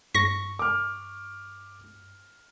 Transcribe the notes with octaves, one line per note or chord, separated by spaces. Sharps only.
G2 C#6 A#6
D6 F6